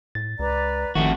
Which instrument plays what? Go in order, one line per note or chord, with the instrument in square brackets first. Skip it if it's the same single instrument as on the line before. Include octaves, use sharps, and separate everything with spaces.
[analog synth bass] A2 [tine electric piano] A6
[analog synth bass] C#2 [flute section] B4 D5 A#5
[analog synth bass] G#1 [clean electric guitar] F2 A3 F#4 [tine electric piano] D#3